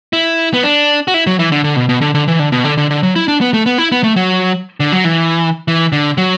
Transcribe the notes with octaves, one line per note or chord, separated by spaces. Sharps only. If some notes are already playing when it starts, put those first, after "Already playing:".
E4
B3
D4
F#4
E4
F#3
E3
D3
D3
B2
B2
D3
D3
E3
D3
B2
D3
D3
D3
F#3
E4
D4
B3
A3
B3
E4
B3
A3
F#3
D3
F#3
E3
E3
D3
F#3